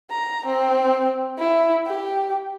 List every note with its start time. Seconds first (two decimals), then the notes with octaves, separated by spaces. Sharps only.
0.11 A#5
0.46 C4
1.38 E4
1.87 G4